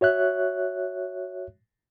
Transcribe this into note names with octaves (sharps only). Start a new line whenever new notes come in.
F#4 C#5 E5 F#6